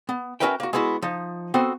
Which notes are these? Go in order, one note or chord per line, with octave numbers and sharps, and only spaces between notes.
B3
C#4 F#4 A#4 B4 E5 G5
A#3 F#4
G#3 B3 E4 F#4
F3 D#4
B3 C4 F#4 A4 C5